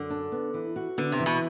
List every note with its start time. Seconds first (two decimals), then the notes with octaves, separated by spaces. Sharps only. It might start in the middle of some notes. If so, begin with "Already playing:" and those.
Already playing: F#2 D3
0.10 D4
0.32 B3
0.54 E3
0.76 F#4
0.98 D3 B3
1.12 C3
1.20 E3
1.26 B2